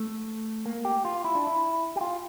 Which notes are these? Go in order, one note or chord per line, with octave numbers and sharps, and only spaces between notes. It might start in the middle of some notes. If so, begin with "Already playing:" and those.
Already playing: A3
A#3
G4
F4
E4
D4
E4
G4
F4